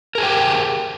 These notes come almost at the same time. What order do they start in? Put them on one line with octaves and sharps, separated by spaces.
A#4 G#4 C5 G5 G4